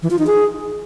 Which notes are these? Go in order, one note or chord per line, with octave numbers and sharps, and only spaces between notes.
E3
F4
D#4
G#4